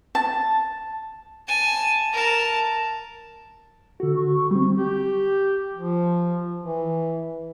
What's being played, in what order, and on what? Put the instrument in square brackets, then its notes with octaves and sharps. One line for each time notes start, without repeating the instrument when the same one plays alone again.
[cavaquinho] A5
[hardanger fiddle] G#5 A5
A#4 A5
[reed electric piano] D3 F#4 [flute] A4
[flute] C#6
[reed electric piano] G3 C4
[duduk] G4
F3
E3